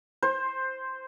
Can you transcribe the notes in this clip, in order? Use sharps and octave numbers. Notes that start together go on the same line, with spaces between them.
C5